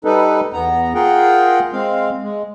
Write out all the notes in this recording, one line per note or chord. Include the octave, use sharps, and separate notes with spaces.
G3 D#4 A4 B4
E2 B3 A#5
F4 G#4 A#4 F#5 G5
G#3 C4 F5
G#3